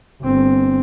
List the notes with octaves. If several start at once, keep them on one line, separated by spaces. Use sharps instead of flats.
G1 C4